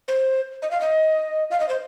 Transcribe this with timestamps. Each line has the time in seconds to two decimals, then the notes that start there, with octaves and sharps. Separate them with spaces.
0.08 C5
0.62 D#5
0.71 F5
0.81 D#5
1.51 F5
1.60 D#5
1.69 C5